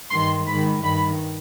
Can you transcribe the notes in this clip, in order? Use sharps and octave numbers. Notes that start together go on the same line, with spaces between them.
G2 D#3 C6
G#2 D#3 B5
G2 D#3 B5